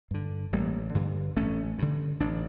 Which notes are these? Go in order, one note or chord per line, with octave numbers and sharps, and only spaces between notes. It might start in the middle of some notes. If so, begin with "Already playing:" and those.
G2 D3
A1 G3 A#3
G2 D3
A1 A3 C#4
G2 D3
A1 D4